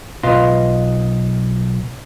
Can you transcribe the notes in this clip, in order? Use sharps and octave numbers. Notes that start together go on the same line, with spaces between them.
B1 F4 B4 D#5 F5 C6